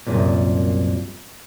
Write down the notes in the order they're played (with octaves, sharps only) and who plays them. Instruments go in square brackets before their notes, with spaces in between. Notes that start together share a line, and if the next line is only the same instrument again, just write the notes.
[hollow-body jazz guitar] C2 F#2 A#2